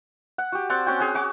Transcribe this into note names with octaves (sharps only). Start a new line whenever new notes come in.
F#5
F#4 G4
C4 D5 F#5
C4 C#4 F#4 G5
C#4 F#4 G#4
F#4 D6